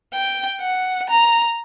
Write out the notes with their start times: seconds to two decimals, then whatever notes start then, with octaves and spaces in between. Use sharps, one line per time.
0.14 G5
0.61 F#5
1.10 A#5